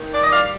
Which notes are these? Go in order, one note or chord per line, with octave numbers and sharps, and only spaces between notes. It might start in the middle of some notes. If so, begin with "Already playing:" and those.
Already playing: D#3
D5
G3 D#5
D5 F5